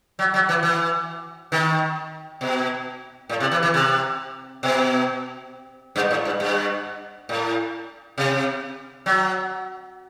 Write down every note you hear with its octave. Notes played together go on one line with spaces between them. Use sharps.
F#3
F#3
E3
E3
D#3
B2
A2
C3
E3
E3
C3
B2
G2
A2
G2
G2
A2
C3
F#3